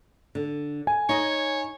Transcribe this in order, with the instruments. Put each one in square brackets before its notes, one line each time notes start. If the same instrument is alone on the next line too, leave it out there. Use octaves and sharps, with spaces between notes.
[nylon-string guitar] D3
[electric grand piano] G#5
[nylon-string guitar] D#4 D#5 [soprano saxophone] C#5